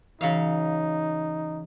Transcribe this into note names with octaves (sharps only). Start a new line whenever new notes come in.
C#3 E3 F#3 D#4 F5